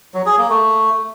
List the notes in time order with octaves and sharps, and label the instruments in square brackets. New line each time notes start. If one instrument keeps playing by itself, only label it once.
[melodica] F#3
G#4
A#3
A3